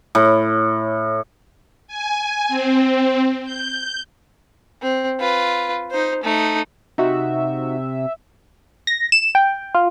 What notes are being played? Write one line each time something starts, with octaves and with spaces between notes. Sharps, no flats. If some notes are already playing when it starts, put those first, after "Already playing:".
A2
G#5
C4
G6
C4
F4 B4
D#4 C5
A3 D#4
C3 D#4 F#4 E5
A#6
E7
G5
F4